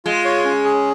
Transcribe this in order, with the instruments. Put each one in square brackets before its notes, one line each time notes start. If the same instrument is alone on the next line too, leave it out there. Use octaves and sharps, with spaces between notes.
[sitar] G#3 [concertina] F4
[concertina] C#5
C#4
G#4